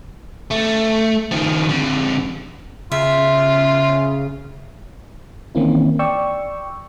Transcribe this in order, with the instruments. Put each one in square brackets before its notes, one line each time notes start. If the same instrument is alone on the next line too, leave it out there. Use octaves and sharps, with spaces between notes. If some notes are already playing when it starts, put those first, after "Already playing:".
[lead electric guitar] A3
D#3 F3
F2 D3
[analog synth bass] C#3 [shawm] F4 [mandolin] E5
[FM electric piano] D#3 E3 A#3 C4 C#4 E4
D5 G5 C#6 E6